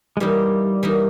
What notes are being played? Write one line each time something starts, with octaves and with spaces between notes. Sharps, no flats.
G#3
E3 G3 A#3 D#4
E3 A#3 D#4